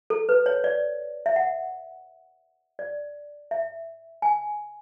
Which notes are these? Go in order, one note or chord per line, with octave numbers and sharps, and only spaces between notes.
A4
B4
C#5
D5
E5
F#5
D5
E5
G#5